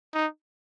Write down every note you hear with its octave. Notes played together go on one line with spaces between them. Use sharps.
D#4